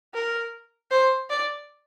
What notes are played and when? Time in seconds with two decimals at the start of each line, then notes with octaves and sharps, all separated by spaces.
0.14 A#4
0.91 C5
1.30 D5